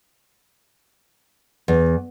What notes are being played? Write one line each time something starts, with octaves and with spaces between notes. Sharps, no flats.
E2